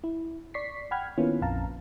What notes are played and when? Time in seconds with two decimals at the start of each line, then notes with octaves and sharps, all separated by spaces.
0.04 E4
0.54 D5 C#6 B6 C7
0.91 F#5 G5 B5 F6 G#6
1.18 D#3 A#3 B3 C#4 E4 F4
1.41 A#1 F2 F5 A5 A#5